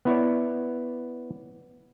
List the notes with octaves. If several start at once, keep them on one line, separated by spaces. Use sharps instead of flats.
B3 E4 C#5 D5